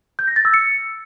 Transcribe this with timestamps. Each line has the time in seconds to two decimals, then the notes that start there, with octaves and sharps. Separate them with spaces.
0.19 G6
0.27 A#6
0.36 A6
0.45 E6
0.54 C#7